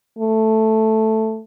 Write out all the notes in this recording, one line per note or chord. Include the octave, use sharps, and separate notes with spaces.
A3